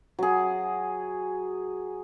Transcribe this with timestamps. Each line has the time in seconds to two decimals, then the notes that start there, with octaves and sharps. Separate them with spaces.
0.19 F#3 G#4